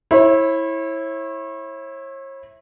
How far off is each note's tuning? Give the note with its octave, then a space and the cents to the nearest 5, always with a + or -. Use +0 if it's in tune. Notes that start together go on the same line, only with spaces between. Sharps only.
E4 -5 C#5 -40